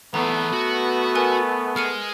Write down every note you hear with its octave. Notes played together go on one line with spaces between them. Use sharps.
E3 A3 B3 D5 A#5
F#4
A#4 B4 G#5
G#3 F6 C#7 D#7